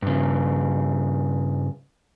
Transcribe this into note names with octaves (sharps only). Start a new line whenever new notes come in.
G2 C#3